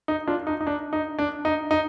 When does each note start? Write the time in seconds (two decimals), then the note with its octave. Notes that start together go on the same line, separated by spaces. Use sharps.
0.08 D#4
0.28 D4 F4
0.47 D#4
0.61 D#4
0.67 D4
0.93 D#4
1.19 D4
1.45 D#4
1.71 D#4